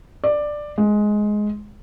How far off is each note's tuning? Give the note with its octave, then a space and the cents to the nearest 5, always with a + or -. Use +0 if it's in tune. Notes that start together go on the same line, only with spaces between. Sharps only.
D5 +10
G#3 +10